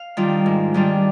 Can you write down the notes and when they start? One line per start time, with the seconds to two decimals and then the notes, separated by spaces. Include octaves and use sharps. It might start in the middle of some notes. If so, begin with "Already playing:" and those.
Already playing: F5
0.17 D#3 G3 D4 F4
0.46 G#2
0.74 D#3 G3 D4 F4